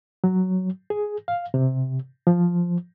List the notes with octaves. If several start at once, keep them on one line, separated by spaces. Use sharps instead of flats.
F#3
G#4
F5
C3
F3